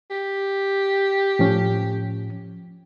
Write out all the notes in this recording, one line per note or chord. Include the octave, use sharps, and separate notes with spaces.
G4
A2 F3 C#4